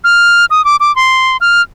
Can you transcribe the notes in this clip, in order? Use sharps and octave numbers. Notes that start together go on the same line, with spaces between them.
F6
D#6
D6
D6
C6
F6